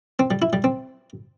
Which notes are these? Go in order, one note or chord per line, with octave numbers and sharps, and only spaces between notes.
C4
G3
E4
G3
C4